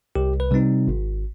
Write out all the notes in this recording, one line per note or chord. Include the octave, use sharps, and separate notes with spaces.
C2 G4
B4
C3 G3 C4 D#4
G#1